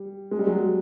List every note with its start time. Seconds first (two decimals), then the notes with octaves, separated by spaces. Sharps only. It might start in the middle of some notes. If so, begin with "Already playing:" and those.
Already playing: G3
0.31 G#3
0.39 G3
0.47 F#3 G#3